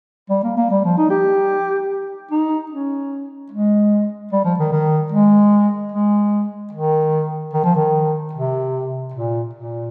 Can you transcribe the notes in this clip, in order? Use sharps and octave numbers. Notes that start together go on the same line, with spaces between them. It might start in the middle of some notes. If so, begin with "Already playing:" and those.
G3
A#3
A#3
G3
F3
D#4
G4
D#4
C#4
G#3
G3
F3
D#3
D#3
G#3
G#3
D#3
D#3
F3
D#3
C3
A#2
A#2